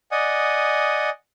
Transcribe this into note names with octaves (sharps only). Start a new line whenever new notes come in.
D5 D#5 F#5 G#5 D#6